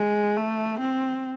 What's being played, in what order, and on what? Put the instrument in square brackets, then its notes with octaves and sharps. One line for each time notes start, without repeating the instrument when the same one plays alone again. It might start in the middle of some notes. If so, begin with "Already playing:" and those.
Already playing: [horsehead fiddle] G#3
A3
C4